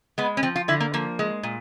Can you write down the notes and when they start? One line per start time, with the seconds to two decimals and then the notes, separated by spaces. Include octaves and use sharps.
0.18 G#3 B3
0.37 C#4
0.43 F3 C4
0.56 F4
0.68 D3 E4
0.80 A#3
0.94 F3 A#3
1.19 G#3
1.43 A#2